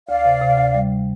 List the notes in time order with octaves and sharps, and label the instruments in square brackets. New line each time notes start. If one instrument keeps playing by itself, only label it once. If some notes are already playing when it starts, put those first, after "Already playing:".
[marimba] D2 [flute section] D5 F5
[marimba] C3
C3
D2
G3